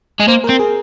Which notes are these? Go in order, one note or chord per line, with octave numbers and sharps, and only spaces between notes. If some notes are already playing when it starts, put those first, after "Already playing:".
G#3
A#3 C5
A#4
C4
G#4